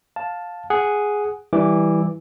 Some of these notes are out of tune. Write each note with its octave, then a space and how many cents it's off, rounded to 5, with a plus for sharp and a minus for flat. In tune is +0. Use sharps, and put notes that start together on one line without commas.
F5 +15 A5 +0
G#4 +0 F#5 +0
E3 -10 G3 +0 D6 +0